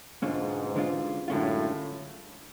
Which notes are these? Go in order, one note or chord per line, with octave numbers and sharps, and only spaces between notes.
G#2 B2 D3 G#3 C#4 F4
D3 G#3 C#4 F4
F#2 A2 D3 G#3 C#4 F4